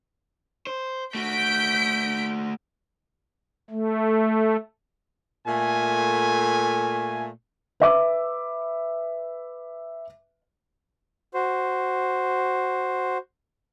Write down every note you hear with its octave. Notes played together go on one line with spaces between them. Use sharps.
C5
A3 F#4 G6 B6 D7
A3
A#2 A3 G#5
B4 E5 D6
F#4 C5